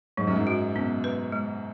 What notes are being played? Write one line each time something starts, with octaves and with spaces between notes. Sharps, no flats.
G#2 F#3
F#2
G#2
F#4
B2 C#4
B4
G#3